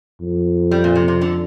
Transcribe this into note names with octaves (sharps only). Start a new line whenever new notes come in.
F2
G3
A#2
C3
C3
D3